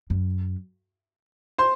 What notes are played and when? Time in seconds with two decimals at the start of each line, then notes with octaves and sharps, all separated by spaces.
0.10 F#2
1.58 C5 C6